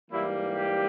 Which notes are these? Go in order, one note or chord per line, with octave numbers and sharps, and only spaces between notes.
G#2 E3 G3 A#3 E4
G4